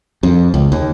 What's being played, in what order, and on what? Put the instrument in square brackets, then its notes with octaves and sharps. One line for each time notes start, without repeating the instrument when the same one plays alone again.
[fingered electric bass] F2
C#2
D#2